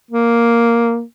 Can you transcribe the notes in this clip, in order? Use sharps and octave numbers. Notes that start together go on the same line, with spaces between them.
A#3